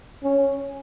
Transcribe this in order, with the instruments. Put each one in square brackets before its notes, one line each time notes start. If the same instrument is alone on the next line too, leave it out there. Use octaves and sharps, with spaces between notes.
[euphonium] C#4